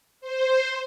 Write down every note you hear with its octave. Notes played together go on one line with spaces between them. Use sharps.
C5